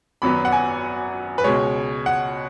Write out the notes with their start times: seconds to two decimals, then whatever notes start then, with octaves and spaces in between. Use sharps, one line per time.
0.22 G#1 F#2 F#3 B3 B5
0.45 F#5
0.52 G#5
1.38 B4
1.44 C#2 B2 G#3 C#5
2.06 F#5